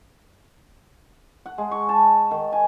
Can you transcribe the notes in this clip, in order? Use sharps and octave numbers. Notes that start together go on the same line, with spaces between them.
F#5
G#3
C#6
A5
D#3
G#5